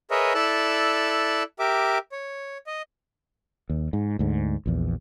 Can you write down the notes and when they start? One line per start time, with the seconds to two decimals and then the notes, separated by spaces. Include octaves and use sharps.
0.11 G#4 A#4 B4 C#5 D#5 E5
0.35 E4 A4 D5 E6 F#6
1.59 G4 A#4 E5 D6
2.12 C#5
2.67 D#5
3.69 D#2
3.93 G#2
4.19 D2 G#2
4.66 A#1 E2